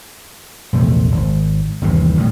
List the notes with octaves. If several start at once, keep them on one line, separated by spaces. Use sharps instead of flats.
A#1 E2 C3 A3
G#1
G1 D#2 C3 E3
A2 G3